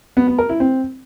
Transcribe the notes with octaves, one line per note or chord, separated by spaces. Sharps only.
B3
B3
A#4
E4
C4